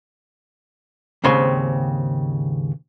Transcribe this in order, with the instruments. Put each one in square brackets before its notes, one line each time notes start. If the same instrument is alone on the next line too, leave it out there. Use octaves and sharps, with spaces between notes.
[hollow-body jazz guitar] D#2 G#2 C#3 C4 C6